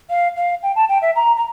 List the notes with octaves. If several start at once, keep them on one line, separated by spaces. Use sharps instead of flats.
F5
F5
G5
A5
G5
E5
A#5
A#5